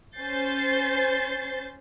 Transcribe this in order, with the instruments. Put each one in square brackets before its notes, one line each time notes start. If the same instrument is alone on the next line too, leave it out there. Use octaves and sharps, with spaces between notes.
[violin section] C#4 C5 G6 A6 C7